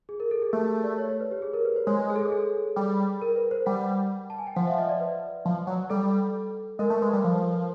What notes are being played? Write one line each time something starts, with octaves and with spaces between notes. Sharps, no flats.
G#4
A#4
A4
G#4
A3 G4
G#4
D5
C#5
C#5
B4
G4
G#4
A#4
B4
C5
G#3 C#5
B4
G#4
A4
G#4
G#4
G3
A#4
B4
C5
G3 F#5
A5
G#5
G5
F3 F#5
E5
D#5
D5
B4
F3
F#3
G3 A4
G#3 A#4
A3
G#3 B4
G3
F3